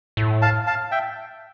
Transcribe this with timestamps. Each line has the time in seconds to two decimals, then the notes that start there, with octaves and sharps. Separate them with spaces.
0.17 A2
0.42 F5 A5
0.67 F5 A5
0.91 E5 G5